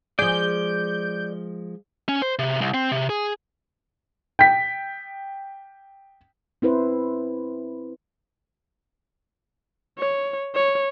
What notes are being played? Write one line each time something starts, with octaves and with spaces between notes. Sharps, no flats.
F3 G#3 G#4 D5 G6
C#4
C5
C3
C2
C4
C3
G#4
G5 B6
C4 E4 B4 C5
C#5
C#5